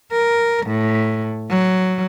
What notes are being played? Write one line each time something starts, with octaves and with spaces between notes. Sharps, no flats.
A#4
A2
F#3